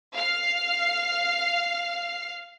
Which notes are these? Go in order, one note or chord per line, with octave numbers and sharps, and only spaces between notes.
F5 F6 C7